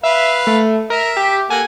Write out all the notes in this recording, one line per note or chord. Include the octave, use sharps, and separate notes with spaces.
B4 E5 F5
A3
A#4 E5
G4
A#3 A4 F#5 G#5